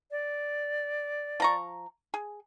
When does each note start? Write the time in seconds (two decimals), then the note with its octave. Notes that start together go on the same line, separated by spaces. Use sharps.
0.11 D5
1.40 F3 A#5 C#6
2.14 G#4